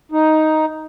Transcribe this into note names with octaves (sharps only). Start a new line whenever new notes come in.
D#4